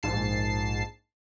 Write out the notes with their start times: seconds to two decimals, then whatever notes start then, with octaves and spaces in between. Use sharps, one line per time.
0.03 A#1 G#2 A5 C7